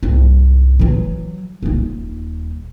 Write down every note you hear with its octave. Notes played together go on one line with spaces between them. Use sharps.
C2 G#2
E3 F#3
D#1 D#4